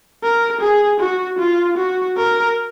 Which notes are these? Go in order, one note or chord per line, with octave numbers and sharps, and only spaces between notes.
A#4
G#4
F#4
F4
F#4
A#4